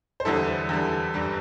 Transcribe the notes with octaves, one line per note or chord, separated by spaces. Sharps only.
C5
E2 D3 G3 E4 A4
E2 D3 G3
G1 G2 G3